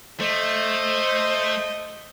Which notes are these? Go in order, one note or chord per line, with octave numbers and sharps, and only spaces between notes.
A3 C5 D#5